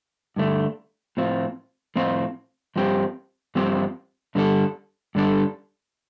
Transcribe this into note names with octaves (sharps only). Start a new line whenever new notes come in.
G2 D3 A3 D4
A2 F3 C4 F4
A2 F3 C4 F4
G2 F3 C4 G4
G2 F3 C4 G4
G2 D3 G3 D4 A4
G2 D3 G3 D4 A4